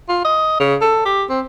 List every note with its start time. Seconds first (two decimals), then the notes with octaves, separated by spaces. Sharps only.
0.09 F4
0.24 D#5
0.60 C#3
0.81 A4
1.05 G4
1.29 C4